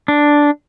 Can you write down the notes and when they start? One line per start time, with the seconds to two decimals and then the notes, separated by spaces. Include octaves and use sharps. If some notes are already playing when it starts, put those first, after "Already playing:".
0.08 D4